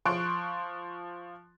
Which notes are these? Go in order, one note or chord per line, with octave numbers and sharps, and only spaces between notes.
F3 C6 C#6 F#6 D7